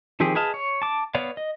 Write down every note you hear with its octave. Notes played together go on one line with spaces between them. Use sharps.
D#3 F3 C4 G4 G#4
G#4 B4 D#5 F5 A5
C#5
A5 D6
B3 B4 C#5 D5 F5
D#5